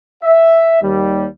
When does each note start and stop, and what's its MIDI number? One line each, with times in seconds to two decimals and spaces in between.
0.23 0.80 76
0.81 1.26 39
0.81 1.26 55